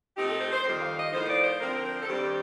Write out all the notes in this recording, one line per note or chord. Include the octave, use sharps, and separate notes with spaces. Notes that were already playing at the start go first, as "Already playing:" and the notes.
A#2 A3 C4 D#4 G4
A4
C5
C5
F2 D#3 G3
F5
D#5
A2 F3 A#3 D#4 C5
D5
C5
D3 F3 C4 A#4
C5
A4
G2 D#3 G3 C4 G4